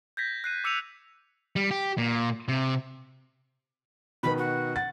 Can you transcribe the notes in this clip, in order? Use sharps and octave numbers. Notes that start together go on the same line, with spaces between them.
G6 G#6 A#6 B6
F#6 C7 D#7
D6 E6 C#7 D#7 F7
G3
G4
A#2
C3
B2 D#3 B3 B5
F#4
F#5 A6